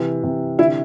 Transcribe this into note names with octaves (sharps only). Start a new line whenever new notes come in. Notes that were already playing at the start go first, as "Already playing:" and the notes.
Already playing: C3 E3
C3
D3 E4